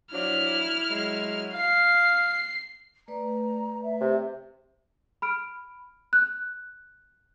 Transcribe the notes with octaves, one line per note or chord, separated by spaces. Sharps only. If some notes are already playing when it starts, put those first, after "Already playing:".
F3 F#3 D4 E4 F6
F#3 G#3
F5 C7
A3 B4 D5 A#5
E5
C3
B5 F6 D7
F#6